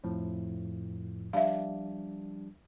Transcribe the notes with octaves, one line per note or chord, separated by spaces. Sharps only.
F2 A2 F3
F3 G3 D4 E5 F5